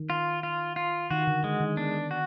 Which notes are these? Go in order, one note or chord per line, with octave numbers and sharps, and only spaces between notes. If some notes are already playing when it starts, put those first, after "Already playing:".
Already playing: D#3
F4
F4
F4
D#3 F#4
D3
D3 G#3
D#3
B3 D4
F#4